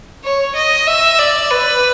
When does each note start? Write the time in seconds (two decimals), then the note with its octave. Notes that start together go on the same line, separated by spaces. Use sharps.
0.24 C#5
0.55 D#5
0.87 E5
1.19 D5
1.50 B4